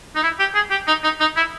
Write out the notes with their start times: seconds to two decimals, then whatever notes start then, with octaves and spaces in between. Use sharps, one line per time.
0.16 D#4
0.23 E4
0.39 G4
0.55 G#4
0.71 G4
0.87 D#4
1.04 D#4
1.20 D#4
1.37 E4